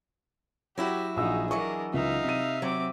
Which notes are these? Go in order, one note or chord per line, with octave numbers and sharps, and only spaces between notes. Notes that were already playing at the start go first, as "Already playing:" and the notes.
F#3 E4 F#4 G4
A#1 D#4 G#4 E6
E3 F#3 D4 A#4 D#5 E5 C#6
C#2 D#4 E5 F5
C3 E5 D#7
F#3 C4 D6